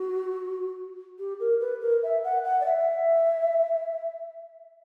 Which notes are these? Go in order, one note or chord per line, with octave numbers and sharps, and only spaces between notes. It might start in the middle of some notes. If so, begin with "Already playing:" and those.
Already playing: F#4
G4
A#4
B4
A#4
E5
F#5
F#5
D5
E5